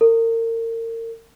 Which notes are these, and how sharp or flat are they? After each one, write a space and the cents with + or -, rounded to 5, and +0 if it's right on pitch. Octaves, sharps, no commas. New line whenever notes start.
A#4 -35